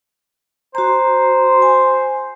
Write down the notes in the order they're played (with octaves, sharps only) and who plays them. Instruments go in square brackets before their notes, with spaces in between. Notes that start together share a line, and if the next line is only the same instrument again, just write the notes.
[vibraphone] F#4 A#5 [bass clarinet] C5
[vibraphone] G#5